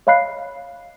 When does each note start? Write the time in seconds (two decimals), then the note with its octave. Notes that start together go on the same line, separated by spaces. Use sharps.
0.07 C#5 D#5 F5 B5 F#6 C7